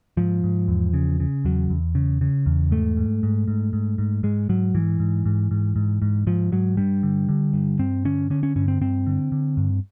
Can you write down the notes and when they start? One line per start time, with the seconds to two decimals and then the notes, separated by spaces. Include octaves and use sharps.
0.17 G#2 F3
0.44 G#2
0.68 E2
0.94 C#3
1.20 C#3
1.45 E2 F#3
1.70 E2
1.95 C#3
2.21 C#3
2.46 E2
2.71 G#2 A3
2.97 G#2
3.23 G#2
3.48 G#2
3.73 G#2
3.98 G#2
4.23 G#2 G#3
4.49 G#2 F#3
4.74 G#2 E3
5.00 G#2
5.25 G#2
5.51 G#2
5.76 G#2
6.02 G#2
6.27 G#2 F3
6.52 G#2 F#3
6.77 G2 G3
7.03 D3
7.29 D3
7.54 G2
7.79 G2 C4
8.05 D3 C#4
8.30 D3 C#4
8.43 C#4
8.56 G2 C#4
8.68 C4
8.81 G2 C4
9.07 D3
9.32 D3
9.57 G2